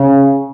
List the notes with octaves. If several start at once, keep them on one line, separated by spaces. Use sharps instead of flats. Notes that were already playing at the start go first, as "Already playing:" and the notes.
Already playing: C#3